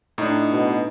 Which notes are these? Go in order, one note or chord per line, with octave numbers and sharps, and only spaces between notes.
A2 D4 D#4
B2